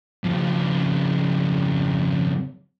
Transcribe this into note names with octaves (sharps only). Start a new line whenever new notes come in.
F2 C#3